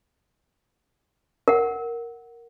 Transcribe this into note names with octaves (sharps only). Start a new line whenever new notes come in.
A#4 F#5